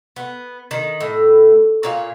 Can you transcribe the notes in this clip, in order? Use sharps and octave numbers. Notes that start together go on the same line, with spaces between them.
B3
D#3
A2
A#2 C#5 F5